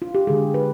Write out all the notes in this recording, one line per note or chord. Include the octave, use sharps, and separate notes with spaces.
F4
G4
D3 G#3 G#4
B4